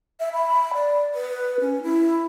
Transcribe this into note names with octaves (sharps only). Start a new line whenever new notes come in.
E5
B5
D5
B4
C#4
E4